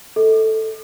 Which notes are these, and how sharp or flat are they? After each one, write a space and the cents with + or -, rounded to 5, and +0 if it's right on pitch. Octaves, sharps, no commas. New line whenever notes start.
A4 +0 D#5 +45